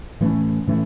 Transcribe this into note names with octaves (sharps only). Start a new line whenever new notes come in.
A2 E3 A3 C#4
A2 E3 A3 C#4